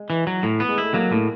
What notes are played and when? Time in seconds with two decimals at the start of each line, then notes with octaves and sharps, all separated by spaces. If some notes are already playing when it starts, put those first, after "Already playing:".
Already playing: G#3
0.10 E3
0.27 F#3
0.43 A2
0.60 B3
0.69 G#3
0.78 A3 E4
0.94 F#3 A#3
1.11 A2 A#3